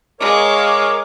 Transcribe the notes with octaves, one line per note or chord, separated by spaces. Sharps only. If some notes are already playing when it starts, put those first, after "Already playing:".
G#3 A#4 C#5 F5 D6